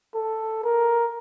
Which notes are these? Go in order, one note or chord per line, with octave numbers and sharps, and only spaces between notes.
A4
A#4